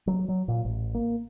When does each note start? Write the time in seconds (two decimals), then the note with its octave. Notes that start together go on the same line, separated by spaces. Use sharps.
0.07 F#3
0.29 F#3
0.48 A#2
0.65 A1
0.94 A#3